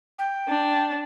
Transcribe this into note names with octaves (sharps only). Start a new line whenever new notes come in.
G5
D4